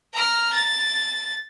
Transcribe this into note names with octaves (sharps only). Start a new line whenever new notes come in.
A#5 F6
A6